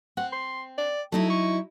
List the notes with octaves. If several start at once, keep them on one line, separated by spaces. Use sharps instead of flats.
C4 F#5
C6
D5
F#3 D#4 E4 A4
C#6